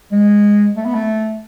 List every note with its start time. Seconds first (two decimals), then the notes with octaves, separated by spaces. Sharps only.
0.12 G#3
0.77 A3
0.85 B3
0.95 A3